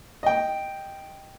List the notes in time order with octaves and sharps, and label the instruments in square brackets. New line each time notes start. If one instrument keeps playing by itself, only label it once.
[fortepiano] D#5 G5